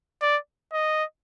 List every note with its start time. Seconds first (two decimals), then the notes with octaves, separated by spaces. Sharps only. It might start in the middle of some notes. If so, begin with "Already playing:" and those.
0.22 D5
0.73 D#5